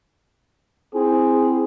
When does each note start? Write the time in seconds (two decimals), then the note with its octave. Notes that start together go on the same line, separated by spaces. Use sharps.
0.95 C4 E4 G#4